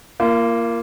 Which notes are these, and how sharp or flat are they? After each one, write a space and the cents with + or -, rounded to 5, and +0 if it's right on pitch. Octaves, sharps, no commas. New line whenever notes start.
A#3 +0 F4 -35